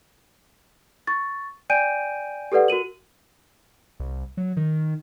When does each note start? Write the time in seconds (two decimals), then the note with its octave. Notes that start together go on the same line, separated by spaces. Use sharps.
1.07 C#6 A6
1.70 D5 G5 G#5 G6 D7 D#7
2.52 G4 A4 B4 D5 F#5
2.68 F#4 A#4 D#7 F#7
4.00 C2
4.37 F#3
4.57 D#3